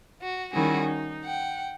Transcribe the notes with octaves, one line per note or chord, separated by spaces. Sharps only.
F#4
D#3 G3 C#4 E4 F#4 G#4
D#4
F#5 G5